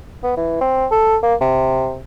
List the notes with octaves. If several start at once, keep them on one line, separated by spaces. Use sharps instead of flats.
B3
E3
C4
A4
A#3
C3